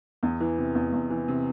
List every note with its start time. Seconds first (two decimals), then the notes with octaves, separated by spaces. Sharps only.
0.23 E2
0.40 E3
0.58 C3
0.75 E2
0.93 E2
1.10 E3
1.28 C3